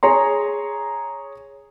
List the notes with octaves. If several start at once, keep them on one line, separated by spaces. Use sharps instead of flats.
G#4 C#5 A#5 C6